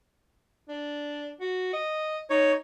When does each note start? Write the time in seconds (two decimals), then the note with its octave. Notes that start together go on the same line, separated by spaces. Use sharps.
0.69 D4
1.41 F#4
1.73 D#5
2.30 D#4 C#5